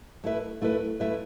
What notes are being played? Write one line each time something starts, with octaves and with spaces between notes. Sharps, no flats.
A3 E4 B4 E5
A3 E4 B4 E5
A3 E4 B4 E5